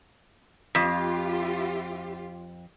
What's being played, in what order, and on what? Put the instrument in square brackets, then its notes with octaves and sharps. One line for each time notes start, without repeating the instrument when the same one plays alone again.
[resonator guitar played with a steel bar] F2 [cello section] F4 G4